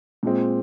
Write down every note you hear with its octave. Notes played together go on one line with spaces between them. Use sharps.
A#2 G#3 C4